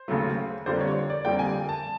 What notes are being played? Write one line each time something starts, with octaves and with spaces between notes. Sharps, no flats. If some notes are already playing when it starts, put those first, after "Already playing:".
Already playing: C5
D#2 C#3 F#3 A3
F2 D3 G3 A#3 C5
C#5
D5
F2 D3 G3 A#3 G5
G#5
A5